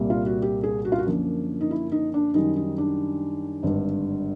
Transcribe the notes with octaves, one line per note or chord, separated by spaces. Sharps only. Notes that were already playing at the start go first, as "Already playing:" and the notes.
Already playing: C2 A#2 G3 A#3
F4
F#4
G4
G#4
F#4
F4
F#4
F#2 D3 F3 A#3
D#4
E4
D#4
D4
F#2 D#3 G3 D#4
D#4
D4
G#1 G2 D3